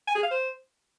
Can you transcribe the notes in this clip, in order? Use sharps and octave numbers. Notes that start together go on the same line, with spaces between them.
G#5
G#4
F5
C5